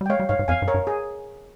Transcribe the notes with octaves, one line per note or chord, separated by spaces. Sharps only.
G3
G5
G#3 C#5 F5
G3
G#2 C#5 F5
G#2
F2 F5 G#5
G2
A#4 C#5
G2
G#4